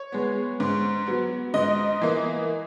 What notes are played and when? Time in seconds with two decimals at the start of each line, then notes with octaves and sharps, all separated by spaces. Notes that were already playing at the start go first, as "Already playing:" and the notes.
Already playing: C#5
0.12 G#3 B3
0.60 G#2
1.06 F#3 B3
1.54 G#2 D#5
2.01 E3 A#3